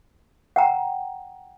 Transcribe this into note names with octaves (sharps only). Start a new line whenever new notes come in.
F#5 G5 A#5